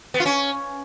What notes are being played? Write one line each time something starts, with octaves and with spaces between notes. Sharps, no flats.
B3
F4
C#4